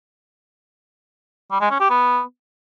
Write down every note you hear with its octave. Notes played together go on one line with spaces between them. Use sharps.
G3
G#3
C#4
G4
B3